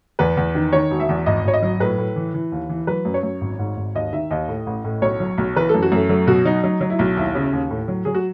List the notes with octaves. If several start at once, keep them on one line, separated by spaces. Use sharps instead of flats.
E2 B4
E2
D#3
D#3 C#5
E1
E5
E2
G#1 D#5
G#1 C#5
D#5
F#3
A2 B4
A2
E3
E3
D#2
E3
F#3 B4
F#2
C#5
F#2
G#1
G#2
G#1
D#2 D#5
D#3 E5
D#2 D#5
A2
A1
A2
B1 C#5
F#3
B1
E3 B4
A4
F#2
F#4
F#2 A3
F#3 A3
B2 F#4
F#3 D#4
F#3 D#4
F#3
E4
B1
D#2 E4
C#3
D#2
A2
F#3
F#3 G#4
F#4